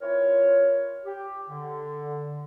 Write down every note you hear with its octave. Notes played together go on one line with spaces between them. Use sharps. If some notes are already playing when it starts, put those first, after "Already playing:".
C4 E4 F4 A#4 C#5
G4
D3